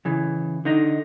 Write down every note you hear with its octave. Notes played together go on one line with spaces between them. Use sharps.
C#3 E3
D3 D#4 D#5